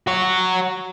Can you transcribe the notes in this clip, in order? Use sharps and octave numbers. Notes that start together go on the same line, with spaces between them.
F#4 C#5